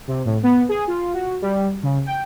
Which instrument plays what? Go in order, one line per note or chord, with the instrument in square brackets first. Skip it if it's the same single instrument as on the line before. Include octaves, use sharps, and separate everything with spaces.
[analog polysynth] C3
A2
B3
G#4
F4
F#4
G3
C#3
G5